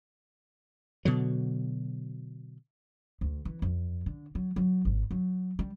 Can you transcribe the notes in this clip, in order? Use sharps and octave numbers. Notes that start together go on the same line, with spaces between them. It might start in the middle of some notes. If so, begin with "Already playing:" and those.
B2 D3 F#3
D2
E3
F2
D3
F#3
F#3
G#1
F#3
G3